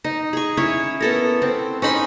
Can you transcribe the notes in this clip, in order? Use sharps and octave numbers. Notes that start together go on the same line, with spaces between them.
D#4
G#4 C#6
C#4 E4 C#5
B3 A4 A#4
C4
C#4 D#4 B5 C6